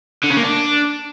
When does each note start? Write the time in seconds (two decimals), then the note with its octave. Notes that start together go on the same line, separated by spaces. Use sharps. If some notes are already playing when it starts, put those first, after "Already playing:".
0.24 D3
0.30 C#3
0.37 A#3
0.43 D4